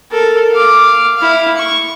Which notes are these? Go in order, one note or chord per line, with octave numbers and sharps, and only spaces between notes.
A4 A#4
F5 D6
E4 F5
C#6